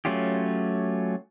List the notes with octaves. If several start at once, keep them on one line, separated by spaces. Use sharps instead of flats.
F#3 A3 C#4 F4 G4